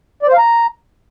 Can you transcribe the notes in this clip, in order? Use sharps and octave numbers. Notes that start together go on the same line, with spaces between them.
D5
C5
F5
A#5